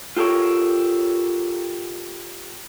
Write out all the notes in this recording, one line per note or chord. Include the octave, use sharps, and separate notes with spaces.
F4 G4 A4 A#4 C#5